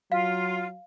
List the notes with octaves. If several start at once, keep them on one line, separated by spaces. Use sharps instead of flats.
F#3 F4 F5